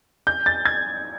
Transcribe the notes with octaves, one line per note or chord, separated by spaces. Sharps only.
G6
A6
G#6